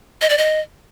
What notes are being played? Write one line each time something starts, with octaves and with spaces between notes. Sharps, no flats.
D#5
D5
D#5